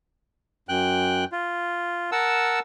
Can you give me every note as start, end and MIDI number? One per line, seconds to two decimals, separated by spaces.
0.69 1.25 42
0.69 1.25 79
0.69 1.25 90
1.32 2.11 65
2.12 2.59 70
2.12 2.59 78
2.12 2.59 81
2.12 2.59 88